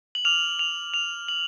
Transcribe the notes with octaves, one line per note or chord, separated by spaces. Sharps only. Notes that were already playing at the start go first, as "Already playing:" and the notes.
F#7
D6 F6 F7
F7
F7
F#7